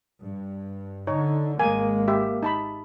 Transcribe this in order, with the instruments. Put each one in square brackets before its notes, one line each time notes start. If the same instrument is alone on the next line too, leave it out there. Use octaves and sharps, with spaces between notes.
[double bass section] G2
[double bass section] D3 [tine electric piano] D#4 [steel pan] C#5
[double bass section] G#1 G#3 [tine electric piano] A#3 [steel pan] G#5
[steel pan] G4 E5
D#4 A5 B5